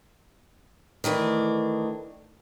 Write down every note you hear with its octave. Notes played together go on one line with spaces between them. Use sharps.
D#3 E3 A3 D4